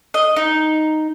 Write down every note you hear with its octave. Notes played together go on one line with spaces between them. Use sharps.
D#5
D#4